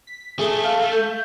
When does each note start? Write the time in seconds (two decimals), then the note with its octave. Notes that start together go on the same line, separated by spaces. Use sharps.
0.07 B6
0.39 A3 G#4
0.64 F5
0.92 G6